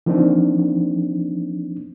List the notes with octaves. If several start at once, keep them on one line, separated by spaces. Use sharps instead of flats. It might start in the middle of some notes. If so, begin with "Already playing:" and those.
E3 F3 A#3 C4 D4 D#4